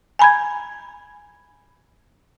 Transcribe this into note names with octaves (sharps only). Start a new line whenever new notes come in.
G#5 A#5 B5 G6 G#6